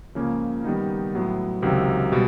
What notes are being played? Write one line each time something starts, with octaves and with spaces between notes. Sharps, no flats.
C#2 C#3 F3 A#3 C#4
D#3 G3 B3 D#4
A2 F#3 B3
C#2 C3 D#3 F#3
B2 G3